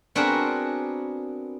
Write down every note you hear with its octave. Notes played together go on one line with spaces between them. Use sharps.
B3 C4 D4 F#4 G#4 A#4